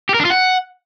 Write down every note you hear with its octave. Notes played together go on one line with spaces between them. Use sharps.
G4
A#4
D4
F4
F#5